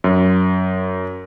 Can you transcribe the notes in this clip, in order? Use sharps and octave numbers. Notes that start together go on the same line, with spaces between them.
F#2